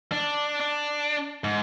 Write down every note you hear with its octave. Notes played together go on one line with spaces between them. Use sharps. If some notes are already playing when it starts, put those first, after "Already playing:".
D4
D4
G#2